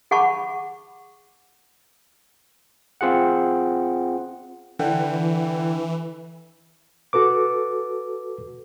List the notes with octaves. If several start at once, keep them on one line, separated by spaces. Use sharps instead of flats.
G#4 F#5 A5 B5 C#6 D6
C4 F4 G#4 F#5
D3 E3 F#5 G5
F#4 A4 B4 D6